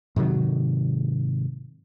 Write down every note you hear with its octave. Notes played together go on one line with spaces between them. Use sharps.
G#2 C3 D#3 F#3